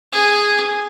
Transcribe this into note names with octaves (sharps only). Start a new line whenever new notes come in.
G#4